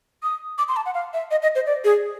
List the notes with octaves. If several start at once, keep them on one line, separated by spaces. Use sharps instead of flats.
D#6
D6
C6
A5
F#5
F5
E5
D#5
D#5
C5
D5
G#4